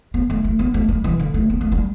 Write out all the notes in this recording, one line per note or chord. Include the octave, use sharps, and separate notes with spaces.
B3
A3
A3
B3
A3
G3
E3
D3
A3
B3
A3
G3